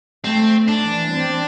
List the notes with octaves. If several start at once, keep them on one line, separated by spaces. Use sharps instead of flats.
A3 C4
D4
E3
C4